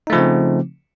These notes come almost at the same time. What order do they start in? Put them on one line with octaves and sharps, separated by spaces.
D#4 A3 F3 C#3 C4